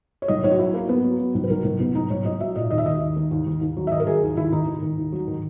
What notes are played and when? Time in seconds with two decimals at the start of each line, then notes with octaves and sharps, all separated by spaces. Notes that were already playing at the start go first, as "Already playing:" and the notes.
0.22 C#5
0.28 B1 D#5
0.44 B1 C#5
0.51 F#4
0.59 F#3 E4
0.74 F#3 A#3
0.89 F#3 B3
1.04 F#3
1.19 F#3
1.35 B1
1.44 B4
1.50 B1 A#4
1.64 B1
1.80 B1 B3
1.95 B1 D#4
2.10 B1 C#5
2.25 B1 D#5
2.40 F#3 E5
2.56 A#2 D#5
2.70 D#2 D#5
2.78 E5
2.86 D#3 D#5
3.01 D#2
3.16 D#3
3.31 D#2
3.46 D#2
3.61 D#2
3.77 F#3
3.87 E5
3.92 D#3 D#5
4.00 A#4
4.07 F#3 G#4
4.23 D#2
4.37 D#2 E4
4.52 D#3 D#4
4.67 D#3
4.82 D#3
4.98 D#2
5.12 F#3
5.28 D#3